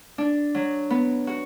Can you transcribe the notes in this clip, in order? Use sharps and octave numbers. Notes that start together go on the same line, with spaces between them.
D4
F#3
B3
F#4